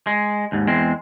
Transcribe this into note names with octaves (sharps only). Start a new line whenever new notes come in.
G#3
D#2 G#2
E2 G#3 C4